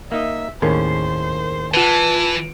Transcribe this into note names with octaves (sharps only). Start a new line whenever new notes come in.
A#3 D#4 D#5 E5
D#2 A2 C#4 G#4 A#4 C5 C7
E3 F4 B4 A5